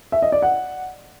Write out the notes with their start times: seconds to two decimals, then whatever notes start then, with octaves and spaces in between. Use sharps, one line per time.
0.12 E5
0.22 D#5
0.32 D5
0.42 F#5